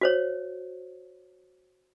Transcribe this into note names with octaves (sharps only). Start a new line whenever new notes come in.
F#4 C5 C#5